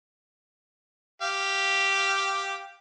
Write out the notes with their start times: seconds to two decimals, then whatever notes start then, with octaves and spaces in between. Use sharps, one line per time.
1.22 G4 F5